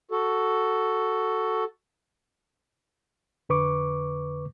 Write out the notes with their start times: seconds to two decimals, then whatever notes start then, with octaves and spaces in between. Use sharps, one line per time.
0.11 F#4 A4
3.49 F2 D3 B4 C#6 D6